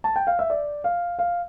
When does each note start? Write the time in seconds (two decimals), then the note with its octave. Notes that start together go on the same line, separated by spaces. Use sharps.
0.04 A5
0.16 G5
0.27 F5
0.39 E5
0.50 D5
0.84 F5
1.19 F5